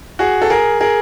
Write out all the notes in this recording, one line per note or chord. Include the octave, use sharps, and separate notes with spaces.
F#4 G#4
A4
G#4 A#4
G#4 A#4